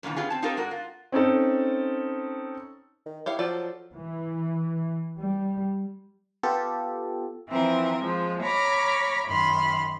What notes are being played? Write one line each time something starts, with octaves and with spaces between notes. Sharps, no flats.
F#2 A#2 D3 E3 F3
B3 C#4 F4 G4 G#4
C4 A5
C4 D#4 F4 G4 A4 A#4
G#2 G#3 F#4 A#4
F4
C4 C#4 D#4 A4
D#3
E4 G4 C#5 F5
F3 F#3 A4 D5
E3
G3
B3 F4 G4 A4
E3 F3 C4 A#4
F3 G#3
C#5 A#5 B5 C#6 D6 F6
F#2 D#3 B5 C6 F6